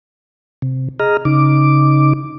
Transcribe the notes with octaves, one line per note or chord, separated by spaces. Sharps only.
C3
G#4 D#5 A#5 F6
C#3 D#4 D6